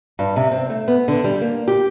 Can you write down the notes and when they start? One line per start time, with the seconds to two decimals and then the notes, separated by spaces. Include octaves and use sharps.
0.19 G2
0.36 C3
0.51 C4
0.70 A3
0.88 B3
1.08 D3
1.24 G3
1.41 A#3
1.68 G4